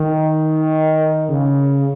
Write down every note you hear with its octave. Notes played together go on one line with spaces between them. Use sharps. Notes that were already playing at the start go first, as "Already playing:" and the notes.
Already playing: D#3
C#3